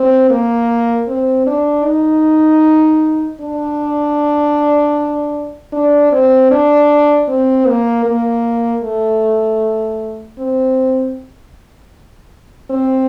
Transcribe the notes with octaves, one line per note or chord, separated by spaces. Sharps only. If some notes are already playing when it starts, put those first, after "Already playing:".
Already playing: C4
A#3
C4
D4
D#4
D4
D4
C4
D4
C4
A#3
A#3
A3
C4
C4